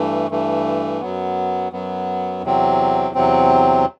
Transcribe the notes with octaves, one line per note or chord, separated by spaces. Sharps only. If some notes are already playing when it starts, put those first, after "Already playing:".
Already playing: G2 E3 A3
G2 E3 A3
F#2 F#3 B3
F#2 F#3 B3
E2 C3 F#3 C4
E2 C3 F#3 C4